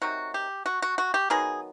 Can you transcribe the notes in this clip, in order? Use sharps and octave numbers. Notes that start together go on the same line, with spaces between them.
C3 D#3 F#3 F#4
G4
F#4
F#4
F#4
G4
D#3 F#3 B3 G#4